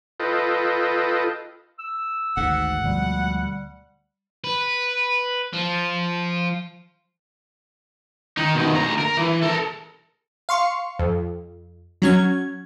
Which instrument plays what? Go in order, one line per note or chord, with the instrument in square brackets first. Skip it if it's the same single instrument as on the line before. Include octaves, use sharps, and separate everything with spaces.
[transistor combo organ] F4 A4 B4 D#5 G5
[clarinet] E6
[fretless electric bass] G#1 [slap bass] D2 G#2 [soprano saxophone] F#5
[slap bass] D2 [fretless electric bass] B2 F3 G#3 [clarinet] G3
[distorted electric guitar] B4
F3
[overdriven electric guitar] D#3 D#4
B2 D#3
D2 A#5
A#4
E3
A4 A#4
[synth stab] F5 C6 C#6
F2
F#3 C#4 G#6